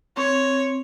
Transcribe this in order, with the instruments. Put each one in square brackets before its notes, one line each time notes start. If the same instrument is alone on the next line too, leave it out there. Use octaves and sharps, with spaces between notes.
[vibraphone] C4 [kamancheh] C#5